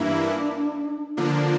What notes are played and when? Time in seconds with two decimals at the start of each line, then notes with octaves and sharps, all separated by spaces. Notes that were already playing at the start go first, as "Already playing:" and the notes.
Already playing: G2 E3 A#3 D4 E4
1.17 D3 F3 A#3 D4 F4